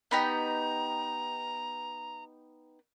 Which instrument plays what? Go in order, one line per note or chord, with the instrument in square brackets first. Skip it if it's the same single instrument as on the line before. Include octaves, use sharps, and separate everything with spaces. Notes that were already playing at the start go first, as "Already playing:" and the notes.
[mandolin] B3 D#4 G4 [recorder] A#5